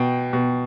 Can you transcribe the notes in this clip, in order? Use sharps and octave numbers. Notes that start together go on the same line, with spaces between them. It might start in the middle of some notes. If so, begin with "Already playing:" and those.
Already playing: B2 G5
B2